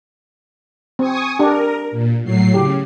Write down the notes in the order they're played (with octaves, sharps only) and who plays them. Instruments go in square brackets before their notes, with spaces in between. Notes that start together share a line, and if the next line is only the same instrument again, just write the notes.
[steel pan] C4 [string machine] G#5 C#6 D#6
[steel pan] D4 G4 [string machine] A#4
[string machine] A#2
A2 F#3 C7
[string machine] C#3 [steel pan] G4